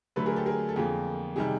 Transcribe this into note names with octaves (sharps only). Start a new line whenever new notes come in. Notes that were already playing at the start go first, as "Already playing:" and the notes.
D3 F#3 A3 A4 B4
G#4 A#4
G4 A4
G#4 A#4
A4
F2 D3 F3 A#3 G#4
C3 D#3 G3 G#4